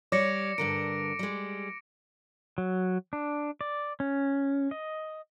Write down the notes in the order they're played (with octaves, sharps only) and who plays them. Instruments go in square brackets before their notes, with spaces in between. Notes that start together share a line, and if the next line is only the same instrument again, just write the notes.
[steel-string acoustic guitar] G3 C#5 D5 [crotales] D6 A#6 C#7
[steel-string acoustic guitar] G2 D3 A#4 [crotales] D7
[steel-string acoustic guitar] G3 G#3
[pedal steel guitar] F#3
D4
D5
C#4
D#5